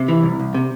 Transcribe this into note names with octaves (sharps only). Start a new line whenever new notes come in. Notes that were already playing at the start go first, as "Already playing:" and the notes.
Already playing: C3
E3
C2
C2
C3